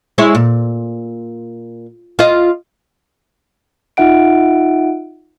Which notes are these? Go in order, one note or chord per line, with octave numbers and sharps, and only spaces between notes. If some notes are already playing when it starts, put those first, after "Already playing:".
G#3 E4 C#5
A#2
F4 D#5
D#4 F4 E5 F#5 D7